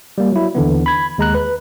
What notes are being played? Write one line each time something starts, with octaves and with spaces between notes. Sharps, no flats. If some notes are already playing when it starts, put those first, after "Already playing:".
G3 A#3
F#3 E4
D#2 D3 E3 B3
B5 G#6
D#2 G#3 A#5 F#6
B4